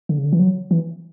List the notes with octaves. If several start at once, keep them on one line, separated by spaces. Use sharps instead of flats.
D3
C#3
D3
E3
F#3
E3